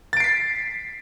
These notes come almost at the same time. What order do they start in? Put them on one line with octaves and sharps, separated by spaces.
A6 D7 C7 B6